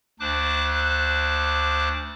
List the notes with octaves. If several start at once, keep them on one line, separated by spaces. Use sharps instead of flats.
D2 D4 C5 D6 F#6